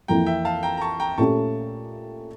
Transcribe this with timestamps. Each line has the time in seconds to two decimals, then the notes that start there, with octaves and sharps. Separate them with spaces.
0.08 F2 E3 A#3 E4 G5 A#5
0.26 E5 G5
0.45 F5 A5
0.63 G5 A#5
0.77 A#5
0.81 A5 C#6
1.00 G5 A#5
1.18 A#2 A3 C#4 G4 A5 C#6